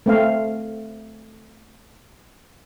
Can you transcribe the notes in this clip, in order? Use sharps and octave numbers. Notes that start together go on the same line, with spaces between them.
A3 C4 F5